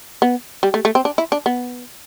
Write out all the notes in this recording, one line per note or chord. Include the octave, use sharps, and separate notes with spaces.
B3
G3
A3
A3
C4
D4
E4
D4
B3